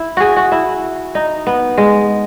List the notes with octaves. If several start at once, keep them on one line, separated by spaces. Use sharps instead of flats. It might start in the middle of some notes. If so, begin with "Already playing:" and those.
Already playing: E4
F#4 G#4
F#4
E4
D#4
B3
G#3